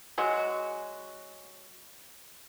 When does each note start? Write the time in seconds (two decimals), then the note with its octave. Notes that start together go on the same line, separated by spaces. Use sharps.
0.18 F#3 G#3 F#4